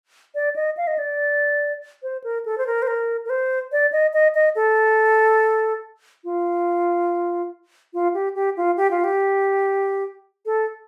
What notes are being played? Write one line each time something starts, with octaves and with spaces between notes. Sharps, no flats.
D5
D#5
F5
D#5
D5
C5
A#4
A4
C5
A#4
C5
A#4
A#4
C5
D5
D#5
D#5
D#5
A4
F4
F4
G4
G4
F4
G4
F4
G4
A4